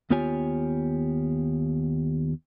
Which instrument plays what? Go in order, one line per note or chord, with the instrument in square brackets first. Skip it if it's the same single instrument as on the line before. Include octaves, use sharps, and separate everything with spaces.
[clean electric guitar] D#2 B3 F4 G4 C#5 G#5